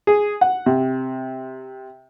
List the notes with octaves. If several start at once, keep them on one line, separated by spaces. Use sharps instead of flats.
G#4
F#5
C3